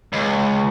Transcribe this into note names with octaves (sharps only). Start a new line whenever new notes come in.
C#2